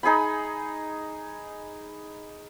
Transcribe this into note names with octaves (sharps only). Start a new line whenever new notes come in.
D#4 G#4 G#5 B5